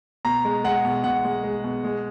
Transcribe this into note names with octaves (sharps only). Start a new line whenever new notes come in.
B2 A#5
G#3
G#3 F#5
B2
B2 F#5
G#3
G#3
B2
G#3